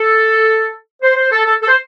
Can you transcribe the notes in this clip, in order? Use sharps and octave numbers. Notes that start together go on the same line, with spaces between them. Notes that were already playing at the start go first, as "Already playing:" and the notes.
Already playing: A4
C5
C5
A4
A4
A4
C5